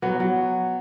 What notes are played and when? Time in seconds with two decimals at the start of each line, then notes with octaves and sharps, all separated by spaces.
0.02 F#3 B3
0.20 F#3